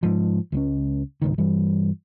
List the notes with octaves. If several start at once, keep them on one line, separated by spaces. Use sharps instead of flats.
G#2 F3
C#2 G#3 C#4
G#1 C#2 D#3
G2 E3 G3